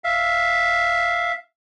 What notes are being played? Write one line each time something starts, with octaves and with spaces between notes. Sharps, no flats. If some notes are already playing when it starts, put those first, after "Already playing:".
E5 F5